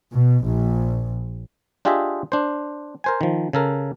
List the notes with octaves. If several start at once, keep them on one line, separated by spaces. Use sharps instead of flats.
B2
A#1
D4 F4 G4 G#4 D#5 E5
D4 C5
A#4 C5 G#5
D#3 F3
C#3 A4 A#4